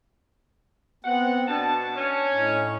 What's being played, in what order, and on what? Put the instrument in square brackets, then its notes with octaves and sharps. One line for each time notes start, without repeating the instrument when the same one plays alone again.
[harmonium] B3 C4 [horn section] F#5
[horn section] B2 A5 [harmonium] D4
[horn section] C#4
[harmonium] A2 D#4